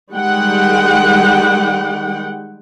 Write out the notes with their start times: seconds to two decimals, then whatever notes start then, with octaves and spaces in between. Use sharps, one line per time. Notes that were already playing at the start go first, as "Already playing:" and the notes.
0.13 D#3 G3 G#3 F#5 G5